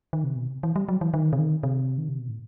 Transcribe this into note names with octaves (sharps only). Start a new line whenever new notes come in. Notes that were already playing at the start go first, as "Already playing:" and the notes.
D#3
C3
B2
C3
E3
G3
F#3
E3
D#3
C3
D#3
C3
D#3
C3
B2
A2